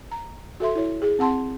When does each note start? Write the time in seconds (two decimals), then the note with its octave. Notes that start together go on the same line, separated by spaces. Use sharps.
0.11 A#5
0.60 F#4 A4 E5 C6
0.75 E4 C#5
1.02 G#4
1.19 C4 F#5 A5 C6